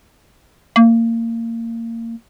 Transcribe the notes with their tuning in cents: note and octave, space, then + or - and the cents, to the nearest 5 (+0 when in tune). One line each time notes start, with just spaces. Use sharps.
A#3 -25